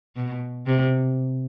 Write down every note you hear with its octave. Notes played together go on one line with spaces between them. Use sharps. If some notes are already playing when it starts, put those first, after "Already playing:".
B2
C3